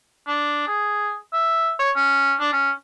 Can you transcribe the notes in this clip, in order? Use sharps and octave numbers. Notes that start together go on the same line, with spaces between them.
D4
G#4
E5
C#5
C#4
D4
C#4